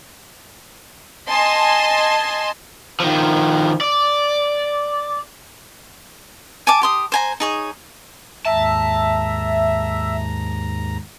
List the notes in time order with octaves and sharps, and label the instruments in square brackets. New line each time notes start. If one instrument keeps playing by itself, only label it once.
[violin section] D#5 G#5 A5 C6
[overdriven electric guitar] D#3 F3
D5
[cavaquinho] G#5 A5 D6
G4 C6 D#6
C5 G#5 A#5
D#4 G#4 C#5
[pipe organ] D#2 G#2 A#5 [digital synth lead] E5 [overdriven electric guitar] A5